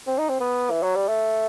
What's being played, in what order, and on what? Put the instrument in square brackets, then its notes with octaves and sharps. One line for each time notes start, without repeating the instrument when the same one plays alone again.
[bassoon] C4
D#4
C4
B3
E3
F#3
G3
A3